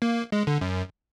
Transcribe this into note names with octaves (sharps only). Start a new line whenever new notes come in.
A#3
G#3
D3
F#2